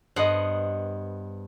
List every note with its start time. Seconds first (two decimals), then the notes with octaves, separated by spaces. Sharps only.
0.16 G2 B3 C5 D#5 F#5